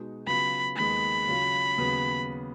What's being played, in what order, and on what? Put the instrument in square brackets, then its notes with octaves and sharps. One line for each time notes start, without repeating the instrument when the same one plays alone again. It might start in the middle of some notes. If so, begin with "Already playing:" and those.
Already playing: [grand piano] B2 G#3 D#4 F#4
[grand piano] C#3 F#3 B3 F4 [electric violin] B5
[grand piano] D#2 D#3 G#3 B3 [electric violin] B5
[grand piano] C#3 F#3 C#4 F4
D#2 C#3 F#3 B3